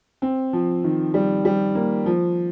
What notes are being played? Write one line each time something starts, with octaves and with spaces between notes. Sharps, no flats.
C4
F3
D#3
G3
G3
A#3
F3